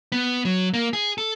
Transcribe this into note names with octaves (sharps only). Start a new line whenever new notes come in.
B3
F#3
A#3
G#4
A4